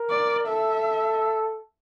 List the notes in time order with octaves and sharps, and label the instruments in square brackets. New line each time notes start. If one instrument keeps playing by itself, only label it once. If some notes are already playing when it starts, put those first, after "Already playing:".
Already playing: [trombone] A#4
[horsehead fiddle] D5
[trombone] A4 [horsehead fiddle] E5